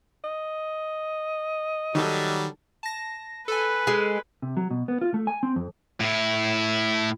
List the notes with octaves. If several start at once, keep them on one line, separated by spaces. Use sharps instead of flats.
D#5
D#3 F#3 G3 A4
A5 A#6
A4 B4 G#5
G#3
C3
F#3
B2
B3
F4
A3
G#5
C4
F2
A2 E4